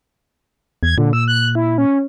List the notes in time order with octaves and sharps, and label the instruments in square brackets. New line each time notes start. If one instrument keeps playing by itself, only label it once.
[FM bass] E2 [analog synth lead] G#6
[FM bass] A#2 [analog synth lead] D3
[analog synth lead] E6
F#6
E4
C#4